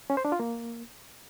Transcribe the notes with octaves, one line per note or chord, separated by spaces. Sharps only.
C#4
C5
D4
F4
A#3